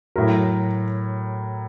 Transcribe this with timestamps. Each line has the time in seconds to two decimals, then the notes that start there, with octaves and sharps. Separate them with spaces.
0.16 A2 F#3 A#4